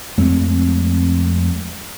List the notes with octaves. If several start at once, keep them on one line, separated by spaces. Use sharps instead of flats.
F2 G#3 A3 C4